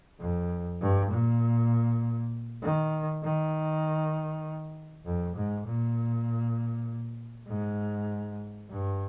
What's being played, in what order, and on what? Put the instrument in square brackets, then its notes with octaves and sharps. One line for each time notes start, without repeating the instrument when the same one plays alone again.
[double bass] F2
G2
A#2
D#3
D#3
F2
G#2
A#2
G#2
G2